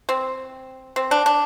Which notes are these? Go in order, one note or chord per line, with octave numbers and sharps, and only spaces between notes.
C4
C4
D4
D4